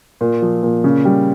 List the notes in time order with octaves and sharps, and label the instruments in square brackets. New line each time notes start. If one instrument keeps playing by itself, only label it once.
[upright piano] A#2
F3
A#2
C#3
G3